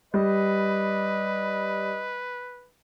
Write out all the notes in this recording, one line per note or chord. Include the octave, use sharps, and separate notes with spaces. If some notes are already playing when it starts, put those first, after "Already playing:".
G3 B4 D#5